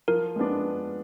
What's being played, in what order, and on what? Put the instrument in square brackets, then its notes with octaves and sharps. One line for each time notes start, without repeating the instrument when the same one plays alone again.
[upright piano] F3 [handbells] A#4
[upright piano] G#3 B3 D4